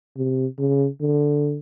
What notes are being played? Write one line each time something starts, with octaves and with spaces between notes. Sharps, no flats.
C3
C#3
D3